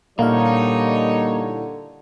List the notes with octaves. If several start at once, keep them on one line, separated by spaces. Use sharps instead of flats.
A#2 D3 G3 A#3 D#4 E4 C#5 F5